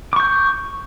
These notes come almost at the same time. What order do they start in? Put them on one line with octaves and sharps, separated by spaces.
D6 C#6 G6